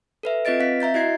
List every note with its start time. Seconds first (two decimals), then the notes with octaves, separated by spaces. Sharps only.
0.23 A4 B4 E5
0.45 C4 F4 B4 D#5 A6 D7
0.60 C4 F5 B6
0.80 E5 A#5 G6 A6
0.94 E4 F#4 D#5 G#6 C7